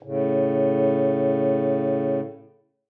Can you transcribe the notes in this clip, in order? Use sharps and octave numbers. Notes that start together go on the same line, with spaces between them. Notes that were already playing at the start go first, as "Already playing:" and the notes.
A2 C#3